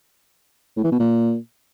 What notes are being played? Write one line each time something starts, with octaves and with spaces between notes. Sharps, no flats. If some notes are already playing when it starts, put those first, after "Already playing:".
A2
E3
B2
A#2